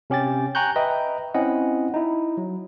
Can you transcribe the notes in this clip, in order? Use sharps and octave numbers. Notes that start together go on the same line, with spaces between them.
C3 C#4 G4 G5 A6
G5 G#5 A#5 C#6 F#6 G6
B4 D#5 E5 G5 A#5
C4 C#4 E4 D#5 F#5
D#4 E4
F#3